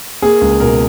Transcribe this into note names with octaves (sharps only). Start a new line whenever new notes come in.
A#3 G#4
C#2
B2 A#4